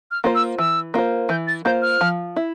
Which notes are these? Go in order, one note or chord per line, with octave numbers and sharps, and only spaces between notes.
F6
A#3 F4 C5
E6
E3 E6
A#3 F4 C5
E3 G6
A6
A#3 F4 C5 G6
F6
F3
E4